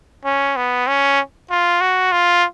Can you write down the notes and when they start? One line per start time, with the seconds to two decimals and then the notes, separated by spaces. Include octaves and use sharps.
0.25 C#4
0.56 B3
0.87 C#4
1.51 F4
1.81 F#4
2.12 F4